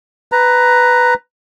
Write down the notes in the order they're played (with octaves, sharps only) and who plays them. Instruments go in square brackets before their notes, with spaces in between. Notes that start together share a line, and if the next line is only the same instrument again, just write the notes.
[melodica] B4 A#5